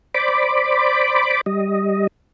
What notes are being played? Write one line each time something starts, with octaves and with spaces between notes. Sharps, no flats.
C5 D5 B5 D6
G3 D#5